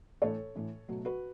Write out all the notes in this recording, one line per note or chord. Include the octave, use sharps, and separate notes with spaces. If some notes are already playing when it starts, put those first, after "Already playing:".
A2 E3 A3 A4 C#5
A2 E3 A3
B2 F#3 A3
F#4 B4